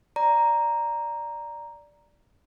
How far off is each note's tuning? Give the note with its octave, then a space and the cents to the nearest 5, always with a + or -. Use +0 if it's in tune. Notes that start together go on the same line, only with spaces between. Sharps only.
D5 +0 A#5 +0